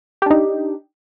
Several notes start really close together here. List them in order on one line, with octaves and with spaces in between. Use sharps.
G4 D4 D#4